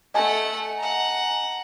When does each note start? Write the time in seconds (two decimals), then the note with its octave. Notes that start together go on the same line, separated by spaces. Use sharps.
0.14 A3 D#5 F#5 G#5 A5
0.78 F#5 A#5